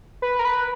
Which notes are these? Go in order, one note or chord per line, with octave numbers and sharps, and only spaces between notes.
B4
A#4
B4